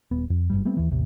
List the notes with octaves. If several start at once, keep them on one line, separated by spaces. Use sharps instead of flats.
D#1 B3
F2
F#1 C#2 G2 G3
G3 A3 B3 C4
D#2 E3
A1 D#2 C3